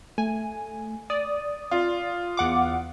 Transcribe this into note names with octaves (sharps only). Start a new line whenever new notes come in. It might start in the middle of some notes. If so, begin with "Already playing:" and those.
A3 G#5
D5 D#6
F4
E2 F#5 D6